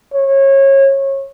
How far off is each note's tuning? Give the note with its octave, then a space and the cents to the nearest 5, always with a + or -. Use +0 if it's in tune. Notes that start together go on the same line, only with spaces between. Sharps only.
C#5 -25